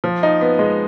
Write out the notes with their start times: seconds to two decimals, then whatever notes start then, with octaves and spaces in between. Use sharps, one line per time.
0.04 F3
0.23 D#4
0.41 B3
0.59 G#3